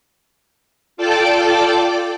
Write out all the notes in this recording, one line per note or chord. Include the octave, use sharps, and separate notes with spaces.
F4 A4 D5 G5 A5 D6